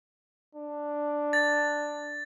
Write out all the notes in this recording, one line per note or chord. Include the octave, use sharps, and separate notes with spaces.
D4
A6